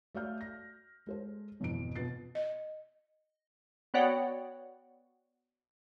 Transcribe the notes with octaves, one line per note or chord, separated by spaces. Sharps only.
A3 F#4 D5 F5 F6 G6
A#6
G#3 A4 C5
G#1 F2 B2 E3 E4 D7
B2 B3 F4 A6 C7
D#5
B3 F#4 C#5 D5 F#5 G5